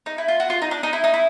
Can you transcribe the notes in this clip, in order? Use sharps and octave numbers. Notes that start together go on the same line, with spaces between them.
D#4
E4
F4
F#4
F4
D#4
D4
D#4
E4
D#4
E4